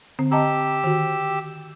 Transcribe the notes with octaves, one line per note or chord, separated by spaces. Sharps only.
D3 C4
G4 D#5 A5 A#5 E6
D#3 F#4